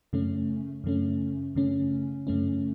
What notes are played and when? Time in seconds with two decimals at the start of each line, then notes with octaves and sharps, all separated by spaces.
0.13 F#2 C#3 A3 C#4
0.84 F#2 C#3 A3 C#4
1.55 F#2 C#3 A3 C#4
2.27 F#2 C#3 A3 C#4